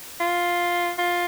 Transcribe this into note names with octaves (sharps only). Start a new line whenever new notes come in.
F4
F4